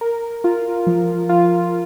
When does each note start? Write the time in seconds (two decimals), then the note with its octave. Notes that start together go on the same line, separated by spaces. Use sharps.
0.01 A#4
0.44 F4
0.87 F3
1.29 F4